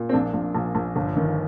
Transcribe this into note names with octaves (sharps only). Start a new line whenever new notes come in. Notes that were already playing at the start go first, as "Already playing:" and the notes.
Already playing: A#2
C4
A#1 D4
A#1
A#1
A#1
G1
D#3